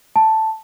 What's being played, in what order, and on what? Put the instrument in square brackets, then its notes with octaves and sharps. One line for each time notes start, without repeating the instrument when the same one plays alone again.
[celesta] A5